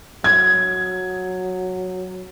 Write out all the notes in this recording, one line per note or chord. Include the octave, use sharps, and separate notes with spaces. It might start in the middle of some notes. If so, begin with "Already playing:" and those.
F#3 G#6